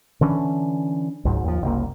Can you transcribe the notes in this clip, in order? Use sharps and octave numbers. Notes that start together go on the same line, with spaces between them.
D3 E3 C#4 D4
C#2 G#2 F#3
D#2 F3
F#1 C2 A#3